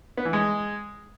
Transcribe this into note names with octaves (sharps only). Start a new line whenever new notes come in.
B3
E3
G#3